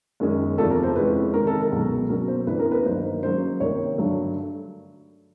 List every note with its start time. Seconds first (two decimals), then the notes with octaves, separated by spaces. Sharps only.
0.20 F#2 D#3 G#3 C#4
0.58 E2 C3 F3 A3 A4
0.71 A#4
0.83 C5
0.96 F2 C#3 E3 G#3 C#4 B4
1.33 C3 D#3 G#3 A#4
1.47 A4
1.61 A#4
1.72 C#2 B2 F#3
2.09 B2 F#3 A#3 C#4 A#4
2.28 C5
2.47 D2 C#3 E3 G3 B3 B4
2.59 A#4
2.71 B4
2.84 G2 D#3 F#3 A#3 D#4 C5
3.04 C5
3.22 C#3 F#3 A#3 C#4 C5
3.60 C2 C3 D#3 G3 A#3 C#5
3.98 G2 D3 F#3 A3